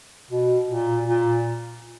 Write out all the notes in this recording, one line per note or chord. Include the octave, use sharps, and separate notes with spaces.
B2
A#2
A#2